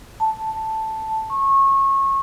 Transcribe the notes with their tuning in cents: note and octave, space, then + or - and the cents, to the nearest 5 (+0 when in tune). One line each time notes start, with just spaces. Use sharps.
A5 +0
C#6 -25